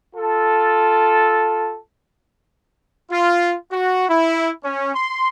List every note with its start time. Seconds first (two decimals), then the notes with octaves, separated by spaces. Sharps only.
0.16 F4 A4
3.11 F4
3.72 F#4
4.08 E4
4.64 C#4
4.95 C6